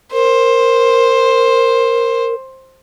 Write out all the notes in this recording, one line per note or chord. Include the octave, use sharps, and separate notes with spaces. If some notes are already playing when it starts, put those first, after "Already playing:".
A#4 C5